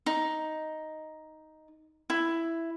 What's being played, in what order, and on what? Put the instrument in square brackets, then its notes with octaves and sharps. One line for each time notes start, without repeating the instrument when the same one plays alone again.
[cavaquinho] D#4
E4